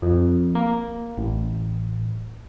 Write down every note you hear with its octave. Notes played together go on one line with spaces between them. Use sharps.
F2
A#3
A1